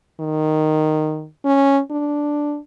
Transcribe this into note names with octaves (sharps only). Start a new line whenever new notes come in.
D#3
C#4
D4